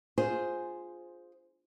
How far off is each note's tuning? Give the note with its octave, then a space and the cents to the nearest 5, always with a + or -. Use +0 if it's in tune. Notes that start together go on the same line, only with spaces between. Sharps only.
F4 +10 G#4 +0 C5 +0